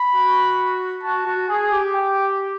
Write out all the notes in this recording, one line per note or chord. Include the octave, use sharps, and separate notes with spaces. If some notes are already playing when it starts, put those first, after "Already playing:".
Already playing: B5
F#4
F#4 A5
F#4
G#4 G#5
G4
G5